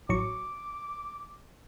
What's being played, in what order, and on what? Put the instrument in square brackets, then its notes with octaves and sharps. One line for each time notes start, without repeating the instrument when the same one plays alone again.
[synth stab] A1 F#3 C#6 [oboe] D6